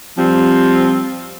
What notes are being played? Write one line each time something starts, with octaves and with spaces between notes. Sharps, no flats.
F3 G3 C4